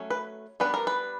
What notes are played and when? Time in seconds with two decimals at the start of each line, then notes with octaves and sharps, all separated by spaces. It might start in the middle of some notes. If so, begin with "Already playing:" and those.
Already playing: F#3 A3 C#4
0.10 B4
0.60 G3 B3 D4 B4
0.74 A#4
0.87 B4